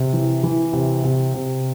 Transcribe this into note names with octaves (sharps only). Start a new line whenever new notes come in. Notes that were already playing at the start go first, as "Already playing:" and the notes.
Already playing: C3
E3
E3
C3
C3
C3